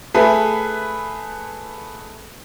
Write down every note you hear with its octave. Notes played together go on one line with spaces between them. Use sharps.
A3 G#4 B4